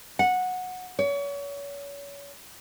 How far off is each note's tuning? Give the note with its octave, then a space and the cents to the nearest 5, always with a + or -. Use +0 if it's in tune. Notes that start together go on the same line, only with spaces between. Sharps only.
F#5 -15
C#5 +35